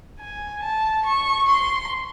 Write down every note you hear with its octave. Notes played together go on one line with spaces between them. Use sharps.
G#5
A5
C#6
C6